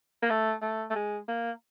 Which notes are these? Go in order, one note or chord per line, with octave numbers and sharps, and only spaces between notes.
A#3
A3
A3
A3
G#3
A#3